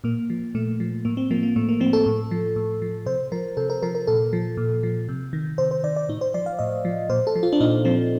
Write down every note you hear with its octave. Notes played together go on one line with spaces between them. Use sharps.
A#2 A#3
F3
A#2 A3
F3
A2 A#3
C4
F3 A#3
A#3
A2 A3
A#3
F3 C4
A4
A2
F3
A2
F3
C3 C5
F3 A#4
C3 A4
A#4
F3 A#4
A#4
A#2 A4
F3
A#2
F3
C3
D#3
C3 C5
C5
D#3 D5
D5
A2 D#4
C5
F3 D5
F5
A2 D#5
F3
A#2 C5
A4
F3
F4
D4
A#2 D#4
F3 C4